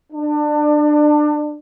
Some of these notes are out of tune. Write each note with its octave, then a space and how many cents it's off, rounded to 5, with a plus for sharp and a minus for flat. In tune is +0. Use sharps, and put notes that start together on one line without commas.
D4 +25